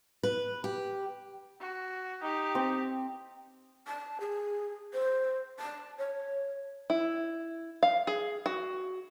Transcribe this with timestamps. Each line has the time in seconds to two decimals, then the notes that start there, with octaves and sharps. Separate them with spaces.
0.23 B4
0.64 G4
1.60 F#4
2.23 D#4 G4
2.55 C4
3.87 A5
4.20 G#4
4.93 C5
5.59 A5
5.98 C#5
6.90 E4
7.83 F5
8.07 G#4
8.46 F#4